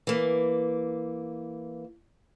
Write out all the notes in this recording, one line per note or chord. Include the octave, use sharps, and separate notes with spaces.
E3 A#3